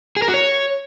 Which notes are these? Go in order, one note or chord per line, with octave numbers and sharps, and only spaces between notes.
G#4
A#4
F#4
C#5